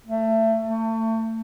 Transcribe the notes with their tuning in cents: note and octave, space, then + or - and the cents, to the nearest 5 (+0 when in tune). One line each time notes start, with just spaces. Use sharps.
A3 +20
A3 +30